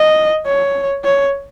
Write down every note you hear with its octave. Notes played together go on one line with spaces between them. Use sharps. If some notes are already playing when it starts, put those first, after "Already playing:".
Already playing: D#5
C#5
C#5